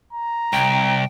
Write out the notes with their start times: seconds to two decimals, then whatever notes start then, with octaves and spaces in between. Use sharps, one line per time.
0.13 A#5
0.53 C2 G5